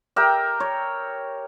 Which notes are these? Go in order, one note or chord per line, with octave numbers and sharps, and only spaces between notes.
G4 A#4 E5 G5
C#5